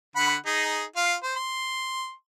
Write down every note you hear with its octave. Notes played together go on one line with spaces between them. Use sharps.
D3 F#5 B5
D#4 G#4
F4 F5
C5
C6